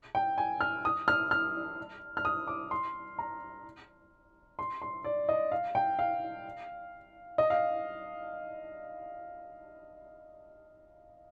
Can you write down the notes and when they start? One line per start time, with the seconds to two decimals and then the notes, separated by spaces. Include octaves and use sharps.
0.15 G5
0.38 G#5
0.61 F6
0.85 D#6
1.08 F6
1.31 F6
2.17 F6
2.25 D#6
2.47 D6
2.71 C6
3.19 A#5
4.59 C6
4.82 C6
5.04 D5
5.29 D#5
5.52 F5
5.75 G5
5.99 F5
7.38 D#5
7.50 F5